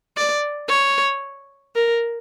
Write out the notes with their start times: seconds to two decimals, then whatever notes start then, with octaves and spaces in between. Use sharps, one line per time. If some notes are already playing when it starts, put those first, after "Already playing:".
0.17 D5
0.69 C#5
1.75 A#4